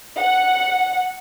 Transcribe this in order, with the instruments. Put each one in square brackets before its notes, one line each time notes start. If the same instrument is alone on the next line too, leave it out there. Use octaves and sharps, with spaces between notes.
[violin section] F#5